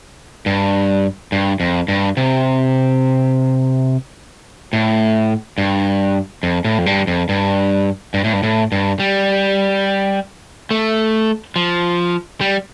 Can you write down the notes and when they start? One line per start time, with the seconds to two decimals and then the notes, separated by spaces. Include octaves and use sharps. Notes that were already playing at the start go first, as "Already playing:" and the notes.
0.46 G2
1.32 G2
1.60 F2
1.88 G2
2.17 C3
4.73 A2
5.58 G2
6.43 F2
6.65 A2
6.78 F2
6.86 G2
7.07 F2
7.29 G2
8.14 G2
8.24 A2
8.33 G2
8.43 A2
8.72 G2
9.00 G3
10.71 A3
11.56 F3
12.41 G3